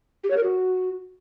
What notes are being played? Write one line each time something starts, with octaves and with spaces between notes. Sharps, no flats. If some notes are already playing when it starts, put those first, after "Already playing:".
G4
C#5
A#4
F#4